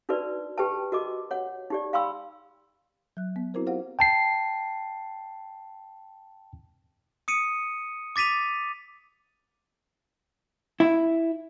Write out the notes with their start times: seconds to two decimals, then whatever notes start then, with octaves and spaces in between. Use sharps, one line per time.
0.09 D4 D#4 F#4 A#4 B4 D5
0.58 G4 B4 G5 A5
0.92 F#4 A#4 D#5 D6
1.31 C#5 F#5
1.70 D#4 G4 D5
1.93 F5 G5 B5 C6 E6
3.17 F#3 F#6
3.36 B3
3.54 C4 E4 F#4 A#4 C5
3.66 F4 G4 C5 F5 F#5
3.99 G5 A5 C7
7.28 D#6 C#7 D#7
8.16 D6 A6 B6 D#7 F7
10.80 E4